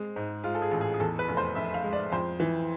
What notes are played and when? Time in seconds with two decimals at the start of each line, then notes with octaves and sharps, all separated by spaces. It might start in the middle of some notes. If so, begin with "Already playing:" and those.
Already playing: G#3 C4
0.16 G#2
0.44 G#3 F4
0.55 A4
0.62 G#4
0.71 A1
0.81 G#4
0.94 G#4
1.00 E2 A4
1.19 B4
1.28 F1
1.37 C5
1.55 F1 E5
1.74 F5
1.84 G#3
1.93 D5
2.12 F2 C5
2.40 E3